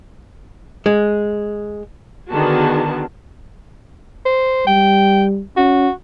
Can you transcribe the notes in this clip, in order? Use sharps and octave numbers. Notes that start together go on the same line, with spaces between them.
G#3
D3 D#3 B3 F#4 G#4 A5
C5
G3 G5
C#4 F#4